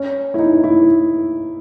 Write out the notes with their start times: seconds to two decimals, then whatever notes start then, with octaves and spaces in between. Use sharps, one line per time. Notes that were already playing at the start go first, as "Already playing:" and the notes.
Already playing: C#4
0.34 E4
0.39 D#4
0.64 E4